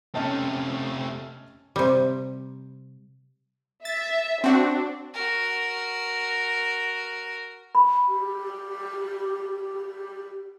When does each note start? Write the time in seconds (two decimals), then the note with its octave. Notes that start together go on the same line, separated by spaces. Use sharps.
0.15 C3 A3 C#4 D#5 A5
1.76 C3 G3
3.85 E5 A6
4.44 C4 D4 F#4
5.14 F#4 A#4
7.75 B5
8.08 G4